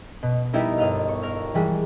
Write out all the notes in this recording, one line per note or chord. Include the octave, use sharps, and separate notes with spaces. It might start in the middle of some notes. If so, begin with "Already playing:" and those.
B2
G3 B3 D#4 E4 A#4
G1 D#5 F5 F6
C#6
A#4 F6
E3 G3 G#3